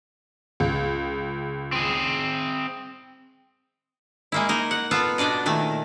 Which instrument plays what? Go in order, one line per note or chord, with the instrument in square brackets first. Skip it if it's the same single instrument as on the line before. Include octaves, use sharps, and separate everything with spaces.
[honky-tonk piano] C#2
[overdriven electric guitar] C4 G#4
[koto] G#3 A#3 E4
A#3 D#4 A#4
F#5
B3 F4 A4
B2 D4 D5 D#5
A#2 D#3 A3